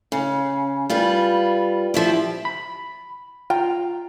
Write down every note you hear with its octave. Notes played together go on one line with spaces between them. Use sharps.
C#3
G3 F4 B4
F3 E4 G4
B5
F4 G5 A#5